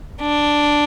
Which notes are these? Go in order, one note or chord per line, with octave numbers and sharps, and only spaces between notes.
D4